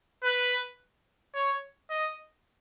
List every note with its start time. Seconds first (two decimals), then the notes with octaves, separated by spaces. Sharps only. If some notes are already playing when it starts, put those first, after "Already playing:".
0.23 B4
1.35 C#5
1.90 D#5